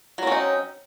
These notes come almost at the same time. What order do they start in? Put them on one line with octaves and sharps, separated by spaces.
F#3 C4 C#4 D#4